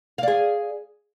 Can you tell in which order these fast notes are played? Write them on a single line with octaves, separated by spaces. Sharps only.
F5 D5 G#4